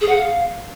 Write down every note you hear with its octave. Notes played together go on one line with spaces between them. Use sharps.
G#4
F#5
F5